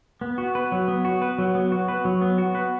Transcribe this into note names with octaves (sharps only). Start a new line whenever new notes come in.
B3
F#4
B4
F#3
B3
F#4
B4
F#3
B3
F#4
B4
F#3
B3
F#4
B4